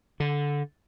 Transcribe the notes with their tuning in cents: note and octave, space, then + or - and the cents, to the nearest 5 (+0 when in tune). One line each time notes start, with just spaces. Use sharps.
D3 -15